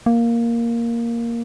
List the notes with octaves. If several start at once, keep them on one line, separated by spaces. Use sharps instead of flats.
A#3